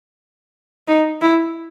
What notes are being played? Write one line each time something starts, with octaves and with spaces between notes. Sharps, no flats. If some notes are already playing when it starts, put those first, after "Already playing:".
D#4
E4